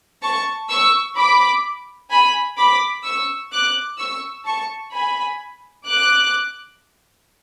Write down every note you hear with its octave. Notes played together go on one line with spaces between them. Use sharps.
A5 C#6
C#6 E6
B5 D6
G#5 B5
B5 D6
C#6 E6
D6 F#6
C#6 E6
A5 C#6
G#5 B5
D6 F#6